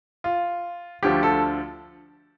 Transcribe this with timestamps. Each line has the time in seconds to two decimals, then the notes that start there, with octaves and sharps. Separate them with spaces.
0.24 F4
1.03 D2 D3 F3 G4
1.23 A4